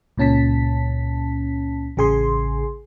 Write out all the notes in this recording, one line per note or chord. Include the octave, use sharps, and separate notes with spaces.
C#2 A#2 C#4 A5 B6
A1 C#3 G#4 G#5 C6